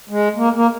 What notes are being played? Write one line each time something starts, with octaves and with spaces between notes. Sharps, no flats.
G#3
A#3
A#3